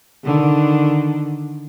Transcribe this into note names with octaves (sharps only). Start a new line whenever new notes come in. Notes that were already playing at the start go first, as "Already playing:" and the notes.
D3 D#3